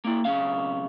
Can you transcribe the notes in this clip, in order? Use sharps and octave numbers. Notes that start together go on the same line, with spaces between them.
A#3 E4
B1 C#3 F5